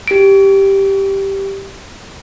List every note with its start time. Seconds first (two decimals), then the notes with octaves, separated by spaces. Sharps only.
0.08 G4 D7